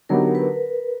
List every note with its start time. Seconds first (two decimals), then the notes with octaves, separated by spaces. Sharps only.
0.09 D3 F#3 B3 D#4 G4 A#4
0.35 B4